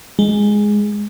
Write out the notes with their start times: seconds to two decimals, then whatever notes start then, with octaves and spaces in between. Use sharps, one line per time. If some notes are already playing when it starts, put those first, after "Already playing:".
0.19 G#3